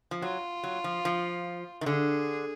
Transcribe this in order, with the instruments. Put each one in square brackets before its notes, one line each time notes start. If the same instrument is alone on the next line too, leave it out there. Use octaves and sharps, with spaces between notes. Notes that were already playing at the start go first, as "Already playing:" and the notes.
[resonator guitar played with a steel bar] F3
[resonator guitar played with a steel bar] F#3 [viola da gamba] F4
[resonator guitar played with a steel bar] F#3
F3
F3
D#3
[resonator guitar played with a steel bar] D3 [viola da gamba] G#4